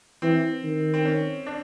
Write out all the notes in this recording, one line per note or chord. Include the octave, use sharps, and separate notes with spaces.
E3 C4
D#3
C4
C#4
D4